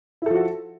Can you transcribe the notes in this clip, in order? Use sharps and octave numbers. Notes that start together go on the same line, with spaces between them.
F3 E4 F#4 A4